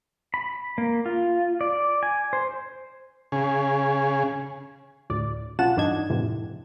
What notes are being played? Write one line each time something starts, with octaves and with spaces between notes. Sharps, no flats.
B5
A#3
F4
D5
G#5
C5
C#3 G#4
D2 A2 D5
B1 C#4 F4 F#5 A5 E7
E2 G2 D4 D#4 D#5 G#6
F2 A2 C3 E3